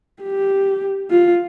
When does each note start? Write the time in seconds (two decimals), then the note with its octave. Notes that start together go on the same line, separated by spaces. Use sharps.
0.23 G4
1.11 F4